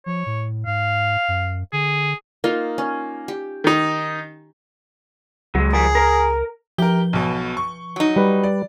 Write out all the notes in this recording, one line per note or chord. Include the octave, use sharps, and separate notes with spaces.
F3 C#5
A2
G#2 F5
F#2
D3 G#4
A#3 D#4 F4
C#4
G4
D#3 D#4
C#2 F#3 G#3
F3 G3 G#4 A#4
A#4 A#5
F3 G4 A#4 G7
B1 B2
C#6
F#3 D#4
G3 B4
D5